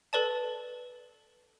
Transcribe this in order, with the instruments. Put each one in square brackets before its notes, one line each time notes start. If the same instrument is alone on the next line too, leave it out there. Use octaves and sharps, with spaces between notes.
[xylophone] A4 B4 D5 A5